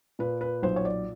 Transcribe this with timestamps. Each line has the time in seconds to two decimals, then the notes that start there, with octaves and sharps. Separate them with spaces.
0.19 A#2 B4
0.41 B4
0.63 B1 C5
0.76 C#5
0.85 D5